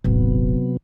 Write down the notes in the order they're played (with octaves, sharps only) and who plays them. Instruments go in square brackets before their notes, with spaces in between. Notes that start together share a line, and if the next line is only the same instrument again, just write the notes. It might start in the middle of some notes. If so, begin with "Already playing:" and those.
[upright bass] D#1 G#1 [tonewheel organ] C3 F#3 B3